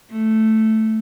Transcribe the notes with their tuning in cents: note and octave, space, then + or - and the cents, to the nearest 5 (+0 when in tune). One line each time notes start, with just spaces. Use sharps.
A3 +0